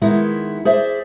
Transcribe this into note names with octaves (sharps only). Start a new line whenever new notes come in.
D#3 G#3 B3 E4
G#4 C5 D5 E5